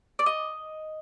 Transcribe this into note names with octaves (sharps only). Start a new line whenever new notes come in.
D5
D#5